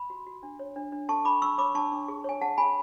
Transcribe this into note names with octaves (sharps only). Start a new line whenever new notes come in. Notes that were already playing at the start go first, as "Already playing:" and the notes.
Already playing: B5
F#4
F#4
D4
C#5
D4
D4
A4 A5 C#6
D4 B5 D6
D4 C#6 E6
C#5 B5 D6
D4 A5 C#6
D4
G#4
C#5 G#5
G#4 F#5 A5
G#4 G#5 B5